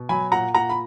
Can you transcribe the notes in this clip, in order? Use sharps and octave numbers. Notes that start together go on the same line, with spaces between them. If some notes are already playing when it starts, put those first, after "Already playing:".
Already playing: B2
F#3 G#5 B5
A#2 F#5 A#5
A#2 F#5 A#5
B5